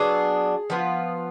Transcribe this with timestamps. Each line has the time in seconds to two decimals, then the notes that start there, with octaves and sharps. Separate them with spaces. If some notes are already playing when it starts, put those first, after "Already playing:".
Already playing: F#3 B3 D4 G#4
0.70 F3 B3 F4